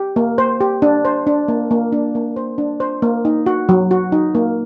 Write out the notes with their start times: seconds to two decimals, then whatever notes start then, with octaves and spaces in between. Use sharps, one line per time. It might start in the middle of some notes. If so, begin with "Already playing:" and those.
Already playing: G4
0.16 A#3
0.38 C5
0.61 G4
0.82 D4
1.05 C5
1.27 D4
1.48 A#3
1.71 A#3
1.93 D4
2.15 A#3
2.36 C5
2.58 D4
2.80 C5
3.02 A#3
3.25 D#4
3.46 F#4
3.69 F#3
3.91 F#4
4.12 D#4
4.35 A#3